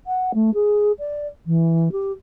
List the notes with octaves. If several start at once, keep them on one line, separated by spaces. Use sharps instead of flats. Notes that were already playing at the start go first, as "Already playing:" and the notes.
F#5
A3
G#4
D5
E3
G4